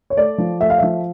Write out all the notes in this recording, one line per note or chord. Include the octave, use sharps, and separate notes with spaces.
C#5
A3 D5
F3
A3 E5
F5
F3 E5